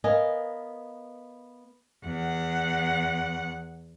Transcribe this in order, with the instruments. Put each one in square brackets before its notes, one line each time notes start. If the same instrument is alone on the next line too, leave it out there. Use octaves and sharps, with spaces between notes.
[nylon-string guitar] B3 A#4 D#5 F5 G#5
[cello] E2 F#5